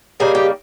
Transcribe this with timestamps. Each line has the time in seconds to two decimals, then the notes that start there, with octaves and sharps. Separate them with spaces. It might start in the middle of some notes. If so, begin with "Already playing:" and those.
0.20 C#3 G3 A#3 D#4 G#4
0.35 G4